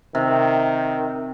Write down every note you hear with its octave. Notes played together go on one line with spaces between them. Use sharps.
C3 D#3